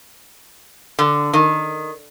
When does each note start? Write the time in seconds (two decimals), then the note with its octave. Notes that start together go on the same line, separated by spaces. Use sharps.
0.99 D3
1.33 D#3